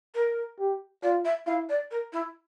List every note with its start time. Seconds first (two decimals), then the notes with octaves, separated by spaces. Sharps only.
0.15 A#4
0.59 G4
1.03 F4 D5
1.25 E5
1.47 E4 F5
1.69 D5
1.91 A#4
2.13 E4